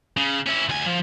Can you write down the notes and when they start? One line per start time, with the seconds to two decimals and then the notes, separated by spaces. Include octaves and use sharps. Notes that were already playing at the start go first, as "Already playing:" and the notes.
0.17 C#3
0.46 C#4 E4
0.69 D2 G#5
0.86 F3